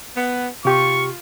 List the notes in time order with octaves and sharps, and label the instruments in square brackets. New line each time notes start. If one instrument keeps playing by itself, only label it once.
[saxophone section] B3
[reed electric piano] C3 G4 [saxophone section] F4 [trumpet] C#6